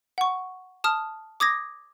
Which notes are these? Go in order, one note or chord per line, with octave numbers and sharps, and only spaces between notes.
F#5 C#6
A5 D#6 F6
D6 D#6 G#6 A#6